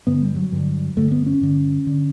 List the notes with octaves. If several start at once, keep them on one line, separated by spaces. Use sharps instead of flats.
G2 D3 B3
G3
F#3
G2 D3
G2 D3 A3
B3
C#4
G2 D3
D3